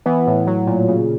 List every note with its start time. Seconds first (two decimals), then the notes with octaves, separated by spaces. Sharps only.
0.06 E3 B3
0.27 A2
0.47 F#3
0.67 A#2
0.88 C#3